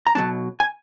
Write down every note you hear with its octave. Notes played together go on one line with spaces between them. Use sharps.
A#5
B1 B2 F#3 A3 D4 A5
G#5